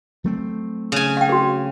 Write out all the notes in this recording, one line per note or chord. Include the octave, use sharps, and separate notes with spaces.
F#3 A3 C4
C#3 G#5
F5 G5
F#4 G#4